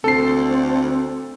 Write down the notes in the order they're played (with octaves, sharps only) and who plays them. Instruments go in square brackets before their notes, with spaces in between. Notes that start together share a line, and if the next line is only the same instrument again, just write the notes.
[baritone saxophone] D2 [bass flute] C4 [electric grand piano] A4 C7